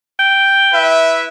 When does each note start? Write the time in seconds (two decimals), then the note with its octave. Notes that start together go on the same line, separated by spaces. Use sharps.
0.19 G5
0.73 E4 B4 E5